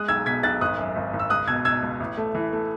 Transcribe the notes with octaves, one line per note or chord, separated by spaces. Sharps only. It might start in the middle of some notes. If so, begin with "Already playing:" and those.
Already playing: G#3 D#6 F#6
B1 E6 G#6
B2 G#6 B6
B1 F#6 A6
G#1 D#6 F#6
F#2
G#1
G#1
E6
C#2 D#6 F#6
B2 E6 G#6
B2 E6 G#6
C#2
A1
A3
E3
A3